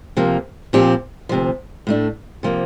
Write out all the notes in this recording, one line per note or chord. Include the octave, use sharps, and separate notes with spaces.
C3 F3 A#3
A#2 F3 C4 G4
D2 C3 F3
A2 A3 D4
C3 F3 A#3